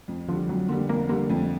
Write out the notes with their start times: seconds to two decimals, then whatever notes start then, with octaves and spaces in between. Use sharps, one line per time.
0.08 F2
0.29 D3 F3 G3
0.49 F2 F#3
0.68 D3 G3 A#3
0.89 F2 A#3
1.09 D3 G3 A#3
1.29 F2 A3